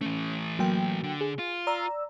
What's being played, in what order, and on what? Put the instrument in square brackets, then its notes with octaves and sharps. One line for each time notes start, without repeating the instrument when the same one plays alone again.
[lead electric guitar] E3 A3 [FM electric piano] C#4
[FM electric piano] F#3 A#3 G5
[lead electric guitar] D3
[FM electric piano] G#4
[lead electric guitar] F4
[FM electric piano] D5 A#5 E6